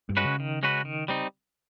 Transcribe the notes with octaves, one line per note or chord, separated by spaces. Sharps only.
G2
G#3 C#4 F#4 B4
C#3
D#3
G#3 C#4 F#4 B4
D#3
G3 C4 D#4